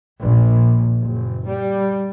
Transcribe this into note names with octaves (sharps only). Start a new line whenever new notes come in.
A#1
F#1
G3